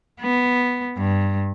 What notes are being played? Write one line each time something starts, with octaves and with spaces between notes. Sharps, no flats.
B3
G2